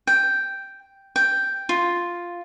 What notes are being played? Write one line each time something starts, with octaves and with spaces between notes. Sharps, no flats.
G5
G5
F4